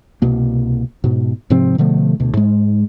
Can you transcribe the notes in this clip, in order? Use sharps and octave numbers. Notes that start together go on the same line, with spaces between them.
C2 B2 A#3
G#2 B2
G#2 C3 F3 C4
B2 D3 F3 A3
D2 B2
G#2 G#3